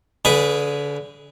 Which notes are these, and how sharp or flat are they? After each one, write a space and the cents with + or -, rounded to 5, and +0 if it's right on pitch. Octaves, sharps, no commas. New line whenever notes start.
D3 -35 G#4 +0 B4 +0